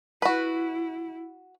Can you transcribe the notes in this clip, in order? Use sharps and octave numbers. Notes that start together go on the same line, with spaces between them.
E4 F#4 B4